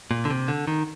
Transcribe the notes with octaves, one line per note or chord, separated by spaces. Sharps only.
A#2
D3
C3
D3
D#3